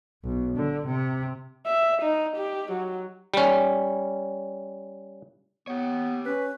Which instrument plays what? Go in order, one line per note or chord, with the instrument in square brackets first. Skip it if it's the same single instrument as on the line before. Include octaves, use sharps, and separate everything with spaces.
[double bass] B1
D3
C3
[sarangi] E5
D#4
G4
F#3
[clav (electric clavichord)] G3 C#4
[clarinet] B3 [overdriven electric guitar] G4 C#5
[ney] C#4 [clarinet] B4